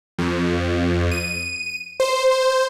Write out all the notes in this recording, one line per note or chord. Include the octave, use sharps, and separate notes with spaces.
F2
D#7
C5